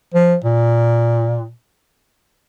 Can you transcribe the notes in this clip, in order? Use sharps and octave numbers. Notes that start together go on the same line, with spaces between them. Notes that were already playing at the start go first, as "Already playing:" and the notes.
F3
A#2